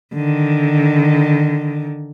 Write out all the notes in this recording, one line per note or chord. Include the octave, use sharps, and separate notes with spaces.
D3 D#3